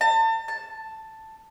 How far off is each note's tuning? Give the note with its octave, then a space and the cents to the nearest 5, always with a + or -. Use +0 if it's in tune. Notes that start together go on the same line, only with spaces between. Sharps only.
A5 +35
A5 +5